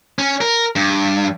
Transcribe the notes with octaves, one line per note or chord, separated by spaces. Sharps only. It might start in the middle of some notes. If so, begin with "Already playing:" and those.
C#4
A#4
G2